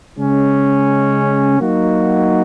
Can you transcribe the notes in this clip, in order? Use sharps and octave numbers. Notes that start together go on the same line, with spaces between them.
C#3 G#3 C#4
F#3 A#3 D#4 F#4